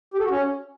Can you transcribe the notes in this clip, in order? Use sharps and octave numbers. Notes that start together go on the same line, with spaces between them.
G4
A4
F#4
C#4